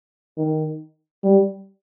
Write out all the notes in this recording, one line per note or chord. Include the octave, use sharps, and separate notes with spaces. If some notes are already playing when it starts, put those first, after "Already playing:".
D#3
G3